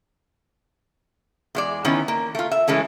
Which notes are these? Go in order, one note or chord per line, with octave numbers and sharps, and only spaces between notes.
E2 G#3 D5
D#3 B3 C#4 D#4 E4
A#3
A3 F4
E5
E3 G#3 A3 C#4